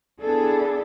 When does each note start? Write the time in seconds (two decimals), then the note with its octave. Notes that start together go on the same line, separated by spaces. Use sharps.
0.21 B3 D4 E4 G#4 A4